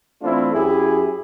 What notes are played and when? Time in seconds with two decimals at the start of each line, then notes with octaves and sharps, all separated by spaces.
0.22 E3 A3 C4 D4 E4 F4
0.54 F#2 E4 G4 G#4